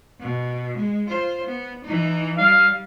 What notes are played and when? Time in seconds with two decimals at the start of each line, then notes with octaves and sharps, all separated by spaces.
0.20 B2
0.76 G#3
1.08 F4 C5
1.47 B3
1.84 E3 D#4
2.38 G3 F5